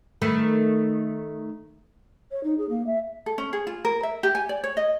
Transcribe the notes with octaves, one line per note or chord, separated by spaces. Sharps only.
D#3 A3 B4
C#5
D#4
G#4
A#3
E5
A4
C#4
G#4
F4
A#4
E5
G4
G#5
D5
C#5
D#5